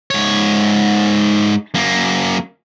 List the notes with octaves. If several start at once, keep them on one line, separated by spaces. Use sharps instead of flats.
G#2 C#5
F#2 A#3